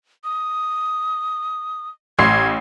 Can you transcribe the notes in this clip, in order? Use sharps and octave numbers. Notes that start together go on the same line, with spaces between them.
D#6
A1 C6 G#6 C7